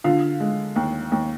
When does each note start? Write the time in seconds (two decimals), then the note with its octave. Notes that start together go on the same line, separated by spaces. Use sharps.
0.04 D3 F4 F5
0.40 G#3
0.76 D#2
1.12 D#2